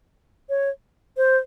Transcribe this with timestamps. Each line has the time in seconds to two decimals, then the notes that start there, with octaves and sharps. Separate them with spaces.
0.49 C#5
1.17 C5